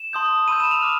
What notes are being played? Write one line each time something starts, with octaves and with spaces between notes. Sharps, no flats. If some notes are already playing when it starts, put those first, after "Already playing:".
Already playing: E7
A5 C6 D#6 G6
B5 E6 G6 D#7
E7
F7
D6 F6